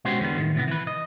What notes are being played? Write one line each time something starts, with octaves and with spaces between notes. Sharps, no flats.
B2 G#3 C#4 F#4 G4 C5
E2 D3 G3 B3
A2 D#3
A2 C3 B3
E3 B4
D#5